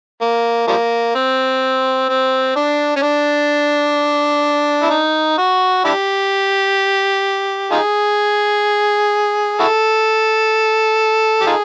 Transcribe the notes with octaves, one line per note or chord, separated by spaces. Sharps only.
A#3
F3 G3 A#3
C4
C4
D4
C#4
D4
E4
D#4
F#4
D4 E4 G4
D#4 F4 G#4
E4 F#4 A4
G4
D#4 F4 G#4